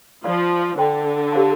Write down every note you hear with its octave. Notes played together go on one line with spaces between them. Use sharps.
F3 F4 D5 F5 C6
D3 C5 G5 C6
G4 C5 F5 A5 C6